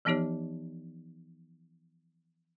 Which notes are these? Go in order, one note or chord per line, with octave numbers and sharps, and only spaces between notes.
E3 F3 B3 D#4 G4 C#5